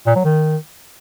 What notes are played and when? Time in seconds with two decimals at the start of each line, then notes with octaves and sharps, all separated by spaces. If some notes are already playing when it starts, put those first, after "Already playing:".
0.07 A#2
0.16 F#3
0.25 D#3